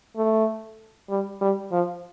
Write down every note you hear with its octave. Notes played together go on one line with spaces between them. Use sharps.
A3
G3
G3
F3